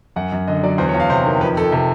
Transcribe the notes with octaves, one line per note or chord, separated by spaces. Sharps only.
F#2 F#5
F#2
D3 D#5
F#3 D5
E2 C5
C#5
E2
F5
C3 C5
D#3
F2 B4
F2 A4
C3 A4